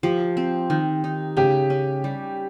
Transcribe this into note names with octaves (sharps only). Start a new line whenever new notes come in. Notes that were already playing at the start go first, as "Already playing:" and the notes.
F3 G4
C4
D#3
D#4
C#3 G4
C#4
G3